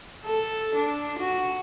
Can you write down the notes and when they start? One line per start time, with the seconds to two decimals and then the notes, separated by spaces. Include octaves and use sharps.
0.24 A4
0.75 D4
1.19 F#4